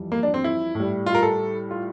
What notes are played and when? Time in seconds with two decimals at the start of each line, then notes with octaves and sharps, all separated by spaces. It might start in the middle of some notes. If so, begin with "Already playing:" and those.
Already playing: F2 E3 G3
0.12 A#3
0.23 D4
0.34 C4
0.44 E4
0.75 A2
0.80 G3
1.06 F4
1.15 A#4
1.22 A4
1.71 F4